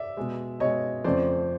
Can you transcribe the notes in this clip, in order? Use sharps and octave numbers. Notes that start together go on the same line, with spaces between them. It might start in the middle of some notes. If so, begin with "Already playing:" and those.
Already playing: D5 E5
B2 G#3
B2 G#3 C#5 D#5
F2 C#3 F3 A3 C5 D5